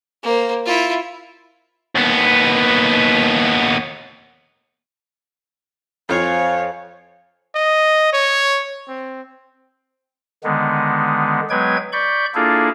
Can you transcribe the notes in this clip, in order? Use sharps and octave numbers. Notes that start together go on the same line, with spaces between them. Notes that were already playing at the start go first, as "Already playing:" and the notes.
A#3 C5
E4 F4
D#2 B3
F2 F4 C5 C#5 F5 G#5
D#5
C#5
C4
D3 D#3 G#3 B3
F#3 G#3 B3 B4 G5 G#6
D5 B5 C#6 G6
A#3 D4 E4 F4 G#4 A4